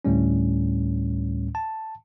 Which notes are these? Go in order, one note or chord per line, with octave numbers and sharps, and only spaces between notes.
D2 A2 G3 C#4
A5